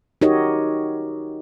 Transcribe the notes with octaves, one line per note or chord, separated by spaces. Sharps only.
D#4 F#4 G4 A#4 C#5 D#5